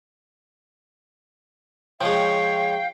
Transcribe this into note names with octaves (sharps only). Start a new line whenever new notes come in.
F3 G#3 C#5 F5 G5